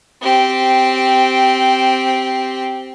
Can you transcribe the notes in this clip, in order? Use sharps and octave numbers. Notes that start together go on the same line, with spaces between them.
C4 G4